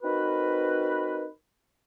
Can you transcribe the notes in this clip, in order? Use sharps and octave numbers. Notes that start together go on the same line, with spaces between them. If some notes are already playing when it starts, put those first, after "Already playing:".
C4 D#4 F#4 A#4 B4